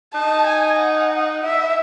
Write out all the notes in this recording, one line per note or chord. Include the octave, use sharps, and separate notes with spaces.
D#4 A5
G#5
F#5
E4 E5